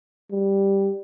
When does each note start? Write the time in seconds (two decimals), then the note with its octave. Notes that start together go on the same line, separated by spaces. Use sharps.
0.31 G3